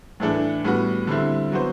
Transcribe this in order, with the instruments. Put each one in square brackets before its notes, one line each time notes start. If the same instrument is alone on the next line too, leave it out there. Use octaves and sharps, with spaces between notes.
[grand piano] A2 E3 A3 D4 A4
A2 G3 B3 F#4
D3 G3 C4 E4
F#3 B3 F#4 C5